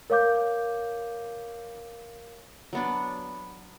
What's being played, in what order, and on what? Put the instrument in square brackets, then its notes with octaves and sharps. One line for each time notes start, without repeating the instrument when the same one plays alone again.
[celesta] A#4 C#5 F5 D6 G6
[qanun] F#3 B3 D4